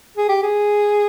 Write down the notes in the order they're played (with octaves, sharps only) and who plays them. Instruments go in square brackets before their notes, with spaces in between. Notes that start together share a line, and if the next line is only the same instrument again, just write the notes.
[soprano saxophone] G#4
G4
G#4